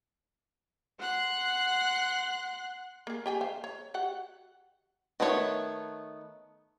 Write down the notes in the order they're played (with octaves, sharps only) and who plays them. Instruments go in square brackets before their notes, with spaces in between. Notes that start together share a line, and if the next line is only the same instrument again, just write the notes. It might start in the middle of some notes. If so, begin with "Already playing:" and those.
[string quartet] F#5 C6 F#6
[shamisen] A#3 G#4
G4 G5 G#5
C5 F5
C#5
F#4 G4 F#5
[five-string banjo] D#3 A3 B3 E4 C#5